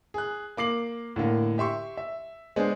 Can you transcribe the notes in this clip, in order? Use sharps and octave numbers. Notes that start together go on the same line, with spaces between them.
G#4 F#6
A#3 D6 C7 F#7
A2 D3 A#3
G4 E5 C6 C#6
E5
G#3 B3 D4 G#4 C5